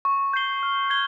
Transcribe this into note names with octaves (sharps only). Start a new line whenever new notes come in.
C#6
G6 C7 G7
F6
G#6 C7 G7